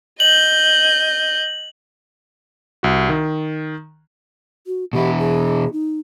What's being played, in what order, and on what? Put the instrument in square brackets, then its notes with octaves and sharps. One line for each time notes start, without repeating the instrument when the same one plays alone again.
[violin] D#5 G6 [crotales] F#7
[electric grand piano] C2 F#4
D#3
[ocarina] F#4
[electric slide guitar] B2 E3 E4 [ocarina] G4
[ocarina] G#4
D#4